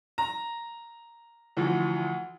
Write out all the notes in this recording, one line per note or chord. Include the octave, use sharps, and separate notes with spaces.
A#5
D2 E3 F3